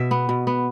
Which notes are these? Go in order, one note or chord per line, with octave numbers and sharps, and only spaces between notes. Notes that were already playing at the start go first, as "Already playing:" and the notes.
Already playing: B2 E5
B3
B2
B3